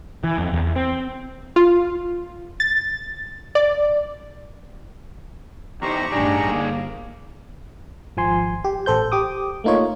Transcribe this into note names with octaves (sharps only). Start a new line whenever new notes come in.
E3
F2
E2
C4
F4
A6
D5
E2 D#4 G4 C5 A#5 C#6
A1 G2 D4 D#4 G#4 D5
G1 A#3
G#1 F3 G#5 C6
G4
A1 A4 C5 G6
G4 D6 D#6
A3 A#3 D#4 F4 C#5